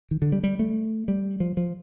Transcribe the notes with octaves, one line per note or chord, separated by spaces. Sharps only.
D#3
D3
G3
G3
A3
G3
F3
F3